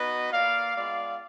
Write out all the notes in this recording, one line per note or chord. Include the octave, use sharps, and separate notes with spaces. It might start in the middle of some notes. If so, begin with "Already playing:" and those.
Already playing: B3 D#4 F#4 B4 D#5
A#3 F4 D5 F5
G#3 B3 F4 D5 F5